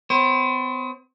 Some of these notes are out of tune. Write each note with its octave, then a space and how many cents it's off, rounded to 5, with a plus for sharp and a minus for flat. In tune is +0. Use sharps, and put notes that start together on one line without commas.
B3 +45 C5 +35